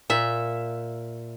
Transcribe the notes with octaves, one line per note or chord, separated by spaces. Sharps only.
A#2 E5